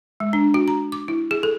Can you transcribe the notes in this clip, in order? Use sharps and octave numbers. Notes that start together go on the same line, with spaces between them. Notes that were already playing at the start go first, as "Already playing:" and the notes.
G#3
D4
F#4
A#5
D6
E4
G#4
A4